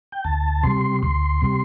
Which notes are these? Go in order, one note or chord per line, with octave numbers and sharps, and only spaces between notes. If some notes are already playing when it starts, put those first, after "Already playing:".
G5
D2 A5
C3 G3 C6
D2 C6
C3 G3